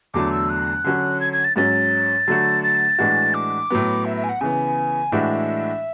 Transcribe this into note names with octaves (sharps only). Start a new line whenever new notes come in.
E2 D3 F#3 A3 D4 D6
E6
F#6
D3 F#3 C#4 F#4
G#6
G#6
A6
G#2 F#3 C#4 A6
D3 F#3 A3 D4 F#4
A6
A2 E3 G#3 D4 F#4
D6
A2 F#3 B3
E5
E5
G#5
F#5
C#3 E3 B3 G#5
A2 E3 G#3 D4 F#4 E5